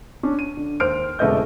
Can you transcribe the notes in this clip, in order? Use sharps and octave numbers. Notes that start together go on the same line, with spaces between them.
C#4 D4
D#7
D3
D#2 C5 F6 D7
E1 C#3 A3 B3 D#5 G6